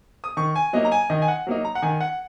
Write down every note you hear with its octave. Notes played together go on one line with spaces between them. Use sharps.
D#6
D#3 C#6
G#5
F#3 A#3 D#4 D#5
A#5
G#5
D#3 D#5
G#5
F#5
F#3 A#3 D#4
A#5
F#5
D#3 G#5
F#5